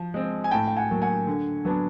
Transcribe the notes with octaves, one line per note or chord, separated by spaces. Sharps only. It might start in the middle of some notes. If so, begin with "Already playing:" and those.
Already playing: F3
G#3 C4
G#5
A2 G5 A5
G5
F#5 G#5
F#3 A#3
F#5 G#5
D3
F#3 B3 D4